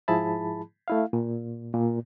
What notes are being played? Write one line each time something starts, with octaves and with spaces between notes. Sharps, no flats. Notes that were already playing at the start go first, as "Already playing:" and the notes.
G#2 F3 E4 G#4 A5 B5
A3 E4 F5
A#2
A#2